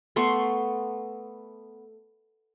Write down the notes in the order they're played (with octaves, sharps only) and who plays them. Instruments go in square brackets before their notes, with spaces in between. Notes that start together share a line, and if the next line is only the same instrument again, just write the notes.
[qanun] A3 B3 C6 C#6